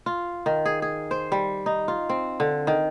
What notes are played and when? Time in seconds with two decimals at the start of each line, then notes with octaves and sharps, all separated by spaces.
0.06 F4
0.46 D#3
0.66 G#4
0.82 G#4
1.11 C5
1.32 G3
1.66 D#4
1.88 F4
2.09 C4
2.40 D3
2.67 D#3